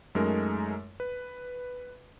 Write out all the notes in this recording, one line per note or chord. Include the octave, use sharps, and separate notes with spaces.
F#2 G#3 A3 D#4 A#4
B4